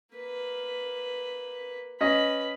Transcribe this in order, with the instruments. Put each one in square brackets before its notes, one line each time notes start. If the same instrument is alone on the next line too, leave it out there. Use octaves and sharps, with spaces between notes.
[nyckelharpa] A#3 B4
[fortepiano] C#4 D#5 [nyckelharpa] B4 B5